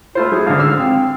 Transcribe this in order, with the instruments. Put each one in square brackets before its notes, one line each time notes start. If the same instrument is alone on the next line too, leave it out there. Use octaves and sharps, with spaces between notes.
[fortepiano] A3 F4 C5 [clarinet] E4
[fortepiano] F#3 [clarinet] G#4
[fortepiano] G#2 D3 [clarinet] F5
[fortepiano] E6 F6
[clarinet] C4